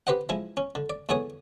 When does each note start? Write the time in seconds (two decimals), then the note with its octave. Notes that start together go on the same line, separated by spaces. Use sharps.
0.07 G4 B4 C5 D#5 F#5
0.29 F3 G#3 E4
0.57 C#4
0.75 D3
0.90 D5
1.09 E2 D3 B3 G#4 C#5 D#6